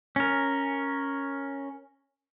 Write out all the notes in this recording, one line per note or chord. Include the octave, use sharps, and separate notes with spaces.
C#4 A#4